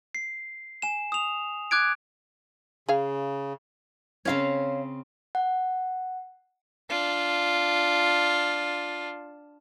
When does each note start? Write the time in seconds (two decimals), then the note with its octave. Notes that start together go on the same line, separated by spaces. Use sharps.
0.15 C7
0.82 G#5 E7
1.12 D#6 F7
1.71 D6 F#6 G#6 D7
2.89 C#3 G#4 F5
4.25 C#3 C4 C#4 C#5 F5
5.35 F#5
6.90 D4 F4